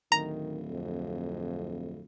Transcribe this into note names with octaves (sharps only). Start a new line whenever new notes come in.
D1 D#3 A#5
F2